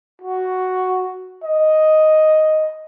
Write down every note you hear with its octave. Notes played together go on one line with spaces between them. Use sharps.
F#4
D#5